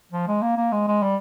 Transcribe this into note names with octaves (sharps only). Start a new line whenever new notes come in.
F3
G#3
A#3
A#3
G#3
G#3
G3